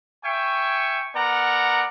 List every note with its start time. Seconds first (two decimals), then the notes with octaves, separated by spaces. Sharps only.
0.24 E5 G5 G#5 C#6
1.15 B3 A#4 D5 F#5 A#5